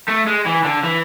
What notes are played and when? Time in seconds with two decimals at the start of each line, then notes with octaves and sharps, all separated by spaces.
0.09 A3
0.27 G#3
0.46 E3
0.64 D3
0.84 E3